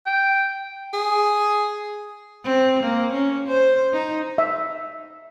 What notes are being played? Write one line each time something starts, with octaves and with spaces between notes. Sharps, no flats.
G5
G#4
C4
A#3
C#4
C5
D#4
E5